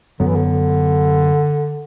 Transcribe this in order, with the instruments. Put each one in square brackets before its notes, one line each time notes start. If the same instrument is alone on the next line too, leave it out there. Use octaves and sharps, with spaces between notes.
[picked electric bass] F#2 F#3 B3 [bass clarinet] D3
[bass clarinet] E3
D3